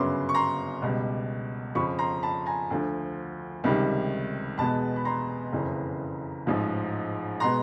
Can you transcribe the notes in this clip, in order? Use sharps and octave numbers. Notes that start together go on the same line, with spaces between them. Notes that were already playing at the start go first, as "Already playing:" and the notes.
Already playing: G1 F#2 C#3 F#3 B3 C6 D6
C#6
A#5 C6
C#2 B2 G3
F2 C#3 F3 B5 C#6
A#5 C6
A5 B5
G#5 A#5
D2 D3 F3
C#2 C3 D#3 G3
E2 B2 G#3 B3 A5 B5
B5
A#5 C6
F#1 F2 C#3 E3
A1 G#2 F3
B2 G#3 B3 A#5 C6